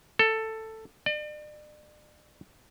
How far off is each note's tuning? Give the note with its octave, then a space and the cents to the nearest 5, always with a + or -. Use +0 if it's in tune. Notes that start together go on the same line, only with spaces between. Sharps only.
A4 +10
D5 +40